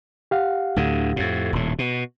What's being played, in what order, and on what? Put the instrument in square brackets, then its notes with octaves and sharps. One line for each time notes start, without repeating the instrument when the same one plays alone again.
[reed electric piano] G4 F5 F#5
[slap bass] D2 A2 D3
F2 A2
D#1 A2
B2